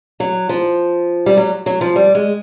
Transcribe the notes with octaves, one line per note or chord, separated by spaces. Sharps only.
F#3
F3
G3
F#3
F#3
F3
G3
G#3